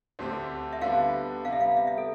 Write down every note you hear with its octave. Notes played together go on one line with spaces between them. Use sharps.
D2 D3 A3 C4 G4
E5
D3 G3 B3 D4 F5
C3 G3 B3 F5
E5
F5
E5
E5
A4